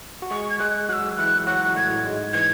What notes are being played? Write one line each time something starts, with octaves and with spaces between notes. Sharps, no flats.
F#4
G#3 G#4 C#6
G#6
G#3 G#4 F#6
F#3 F#4 E6 F#6
E3 E4 F#6
F#3 F#4 F#6
A2 A3 G#6
G#2 G#3
E3 G#6